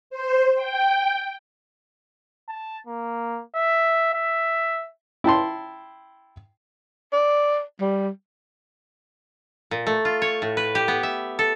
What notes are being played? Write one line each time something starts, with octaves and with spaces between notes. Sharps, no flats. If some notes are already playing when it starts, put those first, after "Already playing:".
C5
G5
A5
A#3
E5
E5
E4 G5 A5 C6
D5
G3
A#2
A3
F4
C#5
A2
B4
G4
B3
E5
A4